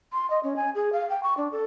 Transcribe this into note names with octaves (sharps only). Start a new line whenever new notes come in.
C6
D#5
C#4
G#5
G#4
F5
G5
C#6
D4
A4